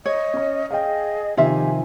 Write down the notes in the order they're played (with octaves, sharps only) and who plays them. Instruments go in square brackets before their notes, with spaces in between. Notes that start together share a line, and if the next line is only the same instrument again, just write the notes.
[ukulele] C#5 [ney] D#5
[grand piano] C#4 C#6
[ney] G#4 [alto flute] D#5 [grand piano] F5 G5
[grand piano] C3 D#3 F3 [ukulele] F4 E5 [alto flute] G4 [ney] G#5